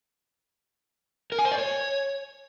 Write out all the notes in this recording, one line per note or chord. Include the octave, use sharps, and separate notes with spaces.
A#4
G#5
C5
D5
C#5